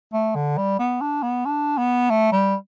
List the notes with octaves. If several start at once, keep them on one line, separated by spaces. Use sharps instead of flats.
A3
D3
G3
B3
D4
B3
D4
B3
A3
G3